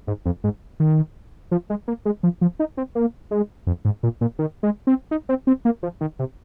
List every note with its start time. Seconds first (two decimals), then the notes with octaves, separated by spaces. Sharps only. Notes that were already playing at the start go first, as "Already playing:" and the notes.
0.07 G#2
0.25 F2
0.44 G#2
0.80 D#3
1.51 F3
1.70 G#3
1.88 A#3
2.05 G#3
2.23 F3
2.41 F3
2.59 D#4
2.77 C4
2.95 A#3
3.31 G#3
3.67 F2
3.85 G#2
4.03 A#2
4.21 A#2
4.39 D#3
4.63 G#3
4.87 C4
5.11 D#4
5.29 C4
5.47 C4
5.65 A#3
5.83 F3
6.01 D#3
6.19 C3